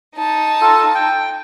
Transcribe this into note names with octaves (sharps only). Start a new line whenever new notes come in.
D#4 A5
F4 A4
G5